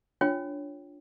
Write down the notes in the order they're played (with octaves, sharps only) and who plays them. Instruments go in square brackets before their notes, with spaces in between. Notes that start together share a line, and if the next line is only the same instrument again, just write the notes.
[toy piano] D4 F4 C#5 G5